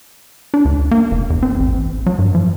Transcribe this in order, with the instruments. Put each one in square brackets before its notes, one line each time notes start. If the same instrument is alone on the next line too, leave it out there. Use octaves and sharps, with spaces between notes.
[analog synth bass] D4
D2
A#3
F1
E2
C4
A1
F#3
G2
F3